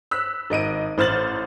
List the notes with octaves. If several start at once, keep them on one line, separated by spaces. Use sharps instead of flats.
E6 F#6 B6
G#1 D#5 D7 D#7
A1 C5 F6 A6 F#7